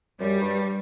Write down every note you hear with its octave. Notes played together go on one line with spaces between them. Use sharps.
F#2 G3
G2